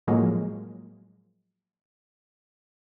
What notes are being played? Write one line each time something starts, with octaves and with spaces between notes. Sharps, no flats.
A2 F3 F#3 G#3 A#3